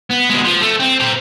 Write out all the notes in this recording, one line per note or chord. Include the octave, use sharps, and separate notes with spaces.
B3
B2 G#3
F3
A3
C4
C5 A#5